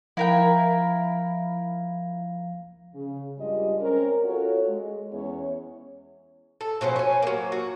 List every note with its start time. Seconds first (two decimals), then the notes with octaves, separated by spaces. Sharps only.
0.17 F3 E4 A#4 F5 G5 A#6
2.94 C#3
3.38 G2 G3 G#3 F4 D#5
3.79 C4 C#4 A#4
4.24 F4 F#4 A4 C#5
4.68 G#3
5.12 E2 B3 C#4 E4 C#5
6.61 A4
6.81 B2 F3 F#3 C#4
6.96 C#5 G#5
7.22 F#3 A#3
7.52 F#4